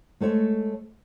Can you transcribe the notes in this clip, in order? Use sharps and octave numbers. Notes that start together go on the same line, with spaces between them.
G#3 A3 A4 C#5